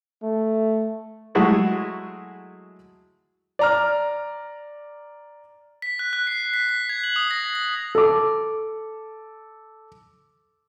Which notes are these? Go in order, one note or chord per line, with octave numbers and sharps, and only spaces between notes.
A3
F#3 G#3 A3 E4 F#4 G#4
D5 A#5 F6
B6
F#6
F#6
C7
B6
B6
G#6
F#7
D#6
A#6
A#6
A4 D6